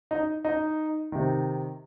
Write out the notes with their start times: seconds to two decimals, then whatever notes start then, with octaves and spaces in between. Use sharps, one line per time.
0.11 D#4
0.45 D#4
1.12 C3 D#3